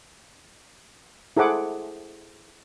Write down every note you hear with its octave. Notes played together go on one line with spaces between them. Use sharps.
E4 G#4 A4 C5 F#5 D6